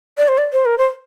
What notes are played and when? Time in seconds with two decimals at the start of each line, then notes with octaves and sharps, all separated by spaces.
0.18 D5
0.28 C5
0.38 D5
0.53 C5
0.66 A#4
0.78 C5